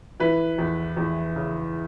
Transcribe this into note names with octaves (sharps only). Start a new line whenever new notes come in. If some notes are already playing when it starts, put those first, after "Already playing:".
E3 B4
E2
E2
C#3